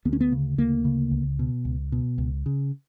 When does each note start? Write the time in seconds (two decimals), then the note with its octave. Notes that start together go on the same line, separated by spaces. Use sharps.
0.05 D2 B3
0.13 C#4
0.21 B3
0.32 C#3
0.58 D2 A#3
0.85 C#3
1.11 C#2
1.39 B2
1.65 C#2
1.92 B2
2.18 C#2
2.46 C#3